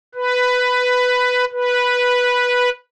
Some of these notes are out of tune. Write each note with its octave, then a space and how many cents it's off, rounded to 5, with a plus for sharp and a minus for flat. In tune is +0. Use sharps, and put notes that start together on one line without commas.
B4 +10
B4 -5